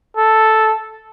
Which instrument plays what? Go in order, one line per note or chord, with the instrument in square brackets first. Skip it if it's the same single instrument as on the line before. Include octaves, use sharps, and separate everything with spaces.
[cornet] A4